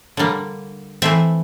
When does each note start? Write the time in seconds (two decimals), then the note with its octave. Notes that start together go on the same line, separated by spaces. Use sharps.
0.17 D3 G3 A#3
1.02 E3 A3 C4 E5